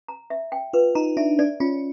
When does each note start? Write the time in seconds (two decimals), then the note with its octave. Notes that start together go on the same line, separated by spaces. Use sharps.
0.08 A#5
0.30 E5
0.52 G5
0.73 F4 B4
0.95 D#4 A#5
1.17 D4 E5
1.39 D4 D5
1.60 C#4 F4